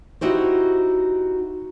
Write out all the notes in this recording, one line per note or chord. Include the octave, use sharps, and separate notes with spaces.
D#4 E4 F#4 G4 C5